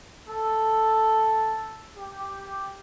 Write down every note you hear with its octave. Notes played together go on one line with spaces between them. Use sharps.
A4
G4